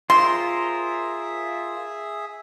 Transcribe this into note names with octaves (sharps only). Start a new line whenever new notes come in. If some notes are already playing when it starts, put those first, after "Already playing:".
F4 G#4 A#4 C5 E5 C6